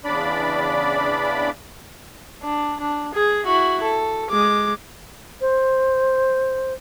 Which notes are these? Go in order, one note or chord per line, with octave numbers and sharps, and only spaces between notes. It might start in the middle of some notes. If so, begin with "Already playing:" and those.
E2 C#3 D4 D5 B5
D4
D4
G#4
E4 F#4
A4
G#3 D6
C5